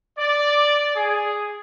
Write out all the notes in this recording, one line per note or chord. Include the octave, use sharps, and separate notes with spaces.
D5
G#4